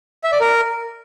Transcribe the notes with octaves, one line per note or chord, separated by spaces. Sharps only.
E5
D5
A#4